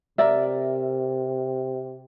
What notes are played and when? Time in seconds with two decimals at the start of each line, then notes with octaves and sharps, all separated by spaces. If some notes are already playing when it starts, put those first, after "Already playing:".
0.18 C3 A#4 D5 E5